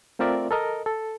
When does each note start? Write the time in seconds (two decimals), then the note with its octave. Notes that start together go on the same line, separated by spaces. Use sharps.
0.19 A3 C4 F4 A#4 D5 E5
0.51 A4 A#4 D#5
0.86 A4